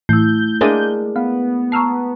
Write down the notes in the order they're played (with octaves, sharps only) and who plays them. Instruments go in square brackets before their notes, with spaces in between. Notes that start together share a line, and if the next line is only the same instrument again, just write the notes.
[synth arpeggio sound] A2 E3 [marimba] A3 E4 [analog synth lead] G6
[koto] G#3 A#3 D4 [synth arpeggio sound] A#4 E5 D#7
[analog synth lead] B3 [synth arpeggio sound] F5
[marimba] A5 A#5 C#6 [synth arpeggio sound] E6 F6 C7